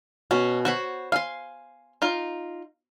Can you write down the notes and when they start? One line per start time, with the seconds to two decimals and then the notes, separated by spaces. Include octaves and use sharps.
0.31 B2 C#4
0.65 F#4 C5 C#5 B5
1.12 F5 G#5 C6
2.02 D#4 F4